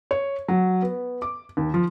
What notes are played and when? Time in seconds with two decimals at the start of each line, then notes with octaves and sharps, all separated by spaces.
0.11 C#5
0.48 F#3
0.82 B3
1.22 D6
1.57 D#2
1.74 F3